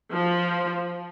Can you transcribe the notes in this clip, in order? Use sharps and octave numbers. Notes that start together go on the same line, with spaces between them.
F3